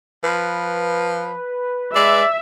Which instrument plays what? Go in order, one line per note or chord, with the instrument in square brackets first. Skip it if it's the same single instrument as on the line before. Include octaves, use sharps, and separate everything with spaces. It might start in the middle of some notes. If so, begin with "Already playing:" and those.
[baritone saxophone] F3 [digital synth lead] B4
[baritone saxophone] G#3 [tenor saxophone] D5 [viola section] E5